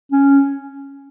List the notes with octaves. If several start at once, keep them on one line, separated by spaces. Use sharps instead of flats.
C#4